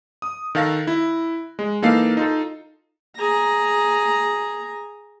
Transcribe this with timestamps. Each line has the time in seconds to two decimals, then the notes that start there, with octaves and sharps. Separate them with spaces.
0.22 D#6
0.55 D#3 A4 F5 F#6 A#6
0.87 E4
1.59 G#3
1.82 E3 A#3 D#4 A4 F5 C7
2.17 D#4 F4 A4
3.17 G#4 A#5